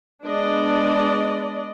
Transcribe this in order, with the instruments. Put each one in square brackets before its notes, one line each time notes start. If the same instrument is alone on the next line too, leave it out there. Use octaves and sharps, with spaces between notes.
[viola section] G#3 B3 D4 D5 D#5